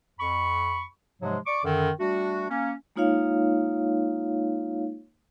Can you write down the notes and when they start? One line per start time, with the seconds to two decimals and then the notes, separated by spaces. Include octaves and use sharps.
0.20 F2 B5 C#6
1.22 G#2 C3 F3 F#3 G#3
1.47 D5 C#6 D6
1.64 F#2 D3 D#3
2.00 G3 A3 D4 F#4
2.49 A#3 C#4
2.96 G#3 A#3 D#4 F4 C#5 F5